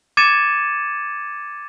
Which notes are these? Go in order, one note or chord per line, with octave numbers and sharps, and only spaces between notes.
D6 G#6 A6 C#7 D#7 E7